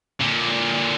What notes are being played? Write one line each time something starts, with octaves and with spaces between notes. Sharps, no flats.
A#2 D3